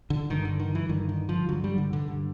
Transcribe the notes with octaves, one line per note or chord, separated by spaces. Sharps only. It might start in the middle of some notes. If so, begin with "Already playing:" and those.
D3
G2 D3 D#3
D3
D#3
E3
G2 D3 D#3
D#3
F3
G2 D3 F#3
G3
D3
D3
G2 D3